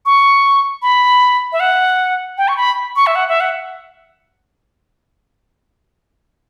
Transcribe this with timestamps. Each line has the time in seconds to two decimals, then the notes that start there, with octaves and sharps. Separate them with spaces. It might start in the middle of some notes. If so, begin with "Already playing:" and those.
0.06 C#6
0.82 B5
1.52 E5
1.60 F#5
2.38 G5
2.48 C#6
2.57 B5
2.96 C#6
3.07 E5
3.15 F#5
3.29 E5
3.40 F#5